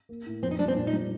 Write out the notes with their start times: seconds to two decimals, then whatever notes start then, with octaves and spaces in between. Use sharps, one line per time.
0.09 A#3
0.26 A2
0.42 F2 C4
0.51 D#4
0.59 G3 D4
0.68 C4
0.76 A#2 D4
0.87 D#4
0.93 G3